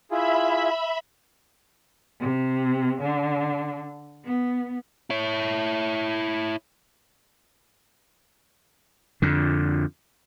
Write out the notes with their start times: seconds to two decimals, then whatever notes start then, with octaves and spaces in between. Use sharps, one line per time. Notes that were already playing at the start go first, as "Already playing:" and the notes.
0.11 E4 F4 G#4 E5 B5
2.20 C3
3.01 D3
4.25 B3
5.10 E4 C#5
9.22 F2 D3